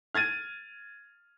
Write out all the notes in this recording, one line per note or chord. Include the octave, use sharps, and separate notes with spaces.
F6 G#6 A6 D#7